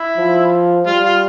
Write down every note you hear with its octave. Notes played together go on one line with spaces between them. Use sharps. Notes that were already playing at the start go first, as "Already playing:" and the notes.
Already playing: E4
F3
G3 F4
F4